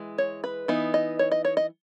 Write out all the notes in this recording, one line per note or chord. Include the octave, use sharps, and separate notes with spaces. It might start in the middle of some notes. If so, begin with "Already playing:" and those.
Already playing: E3 G#3
C#5
B4
E3 B3 D#4
D#5
C#5
D#5
C#5
D#5